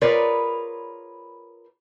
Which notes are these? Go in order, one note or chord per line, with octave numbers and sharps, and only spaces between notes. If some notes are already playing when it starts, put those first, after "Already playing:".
F4 G#4 A#4 B4 C#5 D5